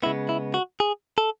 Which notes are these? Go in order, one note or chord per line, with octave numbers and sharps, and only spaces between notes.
C#3 G#3 B3 E4
E4
F#4
G#4
A4